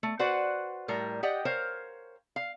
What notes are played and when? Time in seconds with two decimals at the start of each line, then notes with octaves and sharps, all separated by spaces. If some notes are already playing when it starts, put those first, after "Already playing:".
0.03 A3
0.19 F#4 B4 C5 D5 F#5
0.88 A2 G3 A#4
1.23 G4 D5 D#5 F#5 G5
1.45 A#4 C5 C#5 F5
2.36 F5